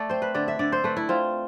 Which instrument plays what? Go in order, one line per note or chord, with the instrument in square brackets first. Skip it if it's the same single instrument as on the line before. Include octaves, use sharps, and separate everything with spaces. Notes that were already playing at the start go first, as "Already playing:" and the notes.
Already playing: [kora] A3 D5
C4 C5
B4
D3 D5
E5
D3 D5
C5
A3 B4
E4
C4 F4